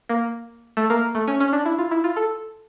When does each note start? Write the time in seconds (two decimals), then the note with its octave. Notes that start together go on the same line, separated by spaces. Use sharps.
0.09 A#3
0.77 A3
0.90 A#3
1.15 A3
1.28 C#4
1.40 C#4
1.53 D4
1.65 E4
1.79 F4
1.91 E4
2.04 F4
2.16 A4